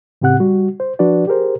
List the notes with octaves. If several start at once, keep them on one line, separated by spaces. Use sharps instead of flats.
A2 C#3 C4 G4 F#5 F#6
G3 F#4
C5
F3 D4 F#4 B4 D5
G4 G#4 A#4 C5